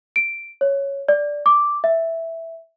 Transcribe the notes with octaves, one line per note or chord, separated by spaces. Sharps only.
D7
C#5
D5
D6
E5